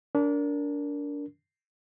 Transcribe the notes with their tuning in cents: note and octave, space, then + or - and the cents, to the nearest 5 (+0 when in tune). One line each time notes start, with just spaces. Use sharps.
D4 -25 A#4 +0